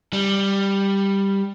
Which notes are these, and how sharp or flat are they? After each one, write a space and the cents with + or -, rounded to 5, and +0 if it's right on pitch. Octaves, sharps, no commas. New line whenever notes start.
G3 +5